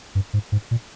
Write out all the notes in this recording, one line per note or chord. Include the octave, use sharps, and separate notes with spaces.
G2
G#2
G#2
A#2